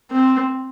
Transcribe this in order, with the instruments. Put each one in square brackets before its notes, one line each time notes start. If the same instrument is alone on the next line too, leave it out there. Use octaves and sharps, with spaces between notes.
[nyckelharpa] C4